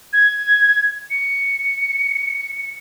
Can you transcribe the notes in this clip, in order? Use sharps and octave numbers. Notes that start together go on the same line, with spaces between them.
G#6
C#7